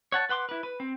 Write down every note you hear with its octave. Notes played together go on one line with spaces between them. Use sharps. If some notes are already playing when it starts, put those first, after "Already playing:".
C#5 F#5 A5
B4 F#5 C6 D6
E4 B4
B4
C4